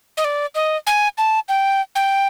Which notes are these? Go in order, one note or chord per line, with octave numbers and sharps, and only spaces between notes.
D#5
D5
D#5
G#5
A5
G5
G5